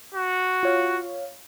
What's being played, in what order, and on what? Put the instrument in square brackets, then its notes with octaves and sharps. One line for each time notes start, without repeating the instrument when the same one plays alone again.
[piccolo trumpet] F#4
[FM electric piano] F4 C#5 F5